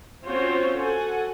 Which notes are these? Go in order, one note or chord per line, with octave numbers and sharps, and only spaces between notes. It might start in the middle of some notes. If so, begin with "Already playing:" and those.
C4 C#4 F4 F#4 C5 C#5
F#4 A4 F#5 G#5